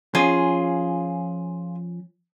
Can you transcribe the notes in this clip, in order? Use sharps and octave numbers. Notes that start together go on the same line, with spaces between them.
F3 C#4 F4 G#4 G#5